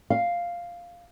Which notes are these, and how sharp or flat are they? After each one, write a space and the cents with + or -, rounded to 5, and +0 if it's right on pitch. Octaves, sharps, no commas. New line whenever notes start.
F5 +0